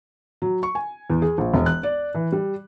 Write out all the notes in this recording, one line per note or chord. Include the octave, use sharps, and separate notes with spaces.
F#3
C#6
G#5
E2
G#4
A#1
E1
F#6
D5
E3
G3